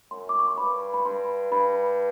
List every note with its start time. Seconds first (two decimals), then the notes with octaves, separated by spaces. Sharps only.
0.11 F#2 C6
0.29 D6
0.39 C#6
0.48 C6
0.58 G2 B5
0.94 B5
1.05 G2 C6
1.51 G2 B5